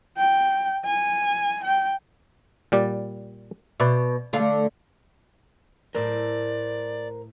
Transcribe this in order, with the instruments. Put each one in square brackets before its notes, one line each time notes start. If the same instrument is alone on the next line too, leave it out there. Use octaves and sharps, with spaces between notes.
[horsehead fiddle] G5
G#5
G5
[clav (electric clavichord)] A#2 G3 D5
[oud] B2 [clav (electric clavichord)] B4 D5 E5
[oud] D3 A3 F5
[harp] A2 A3 [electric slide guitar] A#4 C5 [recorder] D5